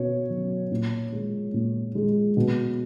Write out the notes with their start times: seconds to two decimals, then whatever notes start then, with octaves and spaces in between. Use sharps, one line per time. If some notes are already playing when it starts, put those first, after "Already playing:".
Already playing: B2 C#5
0.30 F#3
0.71 A#2
1.12 G#3
1.54 A#2
1.95 G#3
2.37 B2